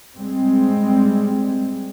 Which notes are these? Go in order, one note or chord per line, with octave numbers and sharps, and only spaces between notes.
G3 G#3 C4